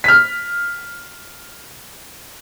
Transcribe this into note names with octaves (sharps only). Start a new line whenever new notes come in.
F6 B6